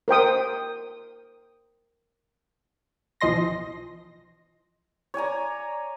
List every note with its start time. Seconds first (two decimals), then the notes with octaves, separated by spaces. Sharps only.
0.08 A#4 C5 G5 D#6
3.21 B1 E3 F3 D#5 C6 A#6
5.14 C#5 D5 G#5 A#5